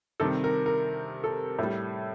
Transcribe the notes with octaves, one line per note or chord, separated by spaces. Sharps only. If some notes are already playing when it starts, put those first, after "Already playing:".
C3 D#3 G3 A4
A#4
A#4
A4
A2 G3